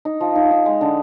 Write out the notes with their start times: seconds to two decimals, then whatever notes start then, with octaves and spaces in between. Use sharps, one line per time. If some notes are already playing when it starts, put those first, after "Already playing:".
0.05 D#4
0.21 F3
0.35 D#4
0.51 D#4
0.66 G#3
0.81 D3